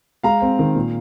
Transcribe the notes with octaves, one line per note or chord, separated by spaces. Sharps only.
G#3 F5 A#5
C4
D#3
A#2